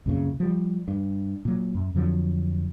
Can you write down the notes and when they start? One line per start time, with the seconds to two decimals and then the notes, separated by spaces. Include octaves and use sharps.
0.06 C2 F#2 A#2 C#3
0.40 F3 G3
0.88 G2
1.45 A#2 F#3
1.75 F#2
1.95 F2 D3 F3 F#3